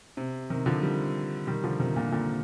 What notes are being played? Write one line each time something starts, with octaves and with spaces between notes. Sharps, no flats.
C3
C3 D#3
D3 F3
D#3 G3
D#3 G3
D3 F3
C3 D#3
A#2 D3
A#2 D3